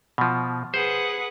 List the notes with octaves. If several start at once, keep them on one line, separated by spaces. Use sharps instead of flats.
B2 F3
G#4 B4 C5 F#5